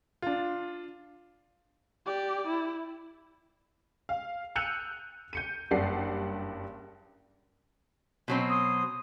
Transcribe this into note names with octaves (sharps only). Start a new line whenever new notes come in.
D4 F4
G4 D5
E4
F5
E6 F#6 G6 C#7 D#7 F7
G6 C#7 D#7
F#1 G2 G4 D5 F#5 C7
B2 F#3 C4
C6 D#6